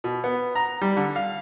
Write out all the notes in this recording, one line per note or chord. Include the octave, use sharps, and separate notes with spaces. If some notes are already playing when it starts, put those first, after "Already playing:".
B2
B3
A#5
G3
D3
F5